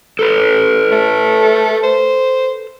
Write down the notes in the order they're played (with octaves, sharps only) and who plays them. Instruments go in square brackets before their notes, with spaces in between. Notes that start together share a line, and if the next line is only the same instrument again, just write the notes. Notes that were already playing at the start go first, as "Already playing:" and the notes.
[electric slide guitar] A4 B4
[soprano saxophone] A3
C5